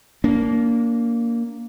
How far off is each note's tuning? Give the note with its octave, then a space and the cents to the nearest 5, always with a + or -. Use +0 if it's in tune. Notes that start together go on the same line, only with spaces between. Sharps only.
A#3 +0 D4 -35